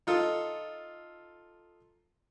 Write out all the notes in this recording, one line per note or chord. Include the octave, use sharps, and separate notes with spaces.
D#4 F4 A4